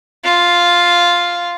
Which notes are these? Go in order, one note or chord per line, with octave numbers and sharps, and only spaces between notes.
F4